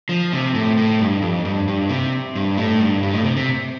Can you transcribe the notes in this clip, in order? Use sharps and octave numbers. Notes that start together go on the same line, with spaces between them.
F3
C3
A2
A2
G2
F2
G2
G2
C3
G2
A2
G2
G2
A2
C3
C3